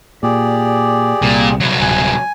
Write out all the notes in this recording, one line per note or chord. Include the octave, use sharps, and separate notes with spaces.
A#2 G4 G#4 D5
C2 A#2
C2 F#3
D1 G#5